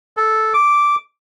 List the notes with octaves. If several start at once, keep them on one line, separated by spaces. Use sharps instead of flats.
A4
D6